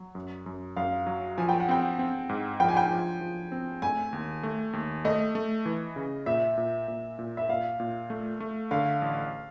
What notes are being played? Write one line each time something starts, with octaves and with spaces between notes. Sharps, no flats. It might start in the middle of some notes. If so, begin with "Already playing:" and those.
Already playing: F#3
F#2
F#2
F#2 F5
F#3
F3 G#5
G5
F#5
C4 G5
C4
G#2
F3 G5
G#5
G5
F3
F3
C4
A3 G#5
D#2
A3
D#2
A3 D#5
A3
E3
C#3
A#2 E5
A#2
A#2
A#2
E5
A#2 F5
A#2
A3
A3
D3 F5
A1